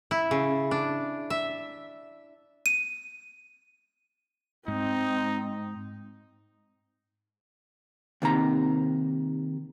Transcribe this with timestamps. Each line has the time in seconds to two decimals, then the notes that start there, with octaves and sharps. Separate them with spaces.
0.11 E4
0.31 C#3
0.71 D4
1.30 E5
2.66 D#7
4.68 G#2 C4 D#4
8.22 D#2 C3 D#3 A#5